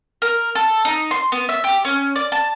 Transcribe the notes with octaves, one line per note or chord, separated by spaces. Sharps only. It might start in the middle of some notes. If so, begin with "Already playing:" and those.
A#4
A4
D#4
C6
B3
E5
G4
C#4
D5
A5